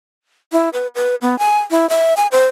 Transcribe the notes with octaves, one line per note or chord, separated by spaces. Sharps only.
E4
B4
B4
B3
G#5
E4
E5
G#5
C5